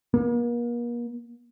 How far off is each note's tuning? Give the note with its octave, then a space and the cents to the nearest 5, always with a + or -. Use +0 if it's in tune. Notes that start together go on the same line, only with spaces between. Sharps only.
A#3 +40